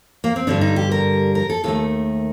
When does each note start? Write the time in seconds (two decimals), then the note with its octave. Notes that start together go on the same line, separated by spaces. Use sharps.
0.24 A#3
0.36 C4
0.47 G2 D3 G3 D4
0.61 D#4
0.76 G4
0.91 A#4
1.35 A#4
1.50 A4
1.64 D#2 D#3 A3 A4